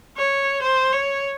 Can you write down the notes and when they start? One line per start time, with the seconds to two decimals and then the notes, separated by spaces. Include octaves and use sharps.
0.17 C#5
0.63 C5
0.92 C#5